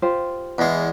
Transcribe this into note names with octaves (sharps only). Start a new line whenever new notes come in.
F4 G4 C5
E2 G#3